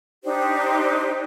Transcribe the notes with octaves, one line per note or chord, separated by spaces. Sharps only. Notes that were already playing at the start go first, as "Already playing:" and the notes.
D4 D#4 G4 C5